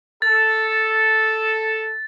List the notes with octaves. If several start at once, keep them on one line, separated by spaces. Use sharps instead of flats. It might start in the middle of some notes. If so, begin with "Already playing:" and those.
A4 A6